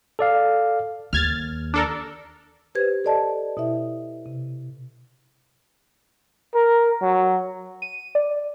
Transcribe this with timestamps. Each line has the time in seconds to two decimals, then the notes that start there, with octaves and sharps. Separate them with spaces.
0.19 A4 D5 F5
1.13 D#2 F6 G#6 A6
1.74 D4 A4 A#4
2.75 G4 B4 C5 G#6
3.04 A4 C5 D5 D#5 A5
3.57 B2 E4 E5
4.26 C3
6.54 A#4
7.02 F#3
7.82 D#7
8.15 D5